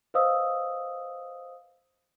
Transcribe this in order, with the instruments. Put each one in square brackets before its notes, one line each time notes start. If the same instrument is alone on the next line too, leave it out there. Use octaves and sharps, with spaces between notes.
[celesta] B4 C5 D#5 F5 D#6 E6